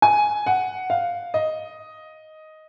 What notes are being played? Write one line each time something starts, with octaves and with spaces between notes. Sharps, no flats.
G#5
F#5
F5
D#5